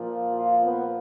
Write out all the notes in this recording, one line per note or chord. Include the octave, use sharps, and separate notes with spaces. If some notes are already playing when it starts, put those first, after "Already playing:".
Already playing: A#2 F3
F4
B3